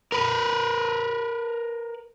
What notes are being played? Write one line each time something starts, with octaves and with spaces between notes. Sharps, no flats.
A#4 B4